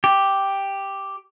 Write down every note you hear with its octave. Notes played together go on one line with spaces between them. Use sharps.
G4